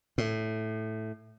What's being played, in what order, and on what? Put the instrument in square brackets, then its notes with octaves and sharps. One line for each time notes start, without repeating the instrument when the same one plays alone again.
[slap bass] A2